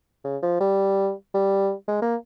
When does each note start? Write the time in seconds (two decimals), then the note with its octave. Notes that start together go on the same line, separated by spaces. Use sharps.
0.25 C#3
0.43 F3
0.61 G3
1.34 G3
1.88 G#3
2.02 A#3